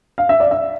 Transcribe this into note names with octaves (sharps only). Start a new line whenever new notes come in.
F5
E5
D5
E5